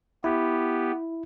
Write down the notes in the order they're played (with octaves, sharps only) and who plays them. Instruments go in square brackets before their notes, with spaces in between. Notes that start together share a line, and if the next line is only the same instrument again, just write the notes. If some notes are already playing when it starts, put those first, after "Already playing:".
[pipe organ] B3 G4 [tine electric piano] E4